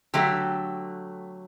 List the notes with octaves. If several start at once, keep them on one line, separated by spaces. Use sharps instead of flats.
D3 F#3 A3 G4